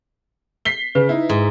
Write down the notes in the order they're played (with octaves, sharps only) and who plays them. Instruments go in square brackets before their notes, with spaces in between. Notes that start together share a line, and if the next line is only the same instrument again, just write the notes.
[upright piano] B6 C7 G7
[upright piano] C#3 [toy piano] B4
[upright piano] D#4 E4
[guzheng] G#2